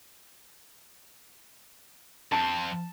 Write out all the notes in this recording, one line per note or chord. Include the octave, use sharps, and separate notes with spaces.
F2 C4 A5